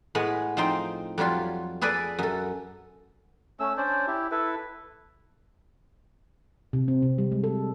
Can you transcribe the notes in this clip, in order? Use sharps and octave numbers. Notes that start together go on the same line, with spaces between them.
A2 G#3 B3
F3 C4 D#4 G5 C6
F2 F#3 G3 F4 C6
G#4 A4 B4 D5 G#5
F#2 A4
A3 C#4 E6
C#4 D4 C5 D5
E4 G4
E4 A4 B4
C3
C4
C3
G3
G#3
A4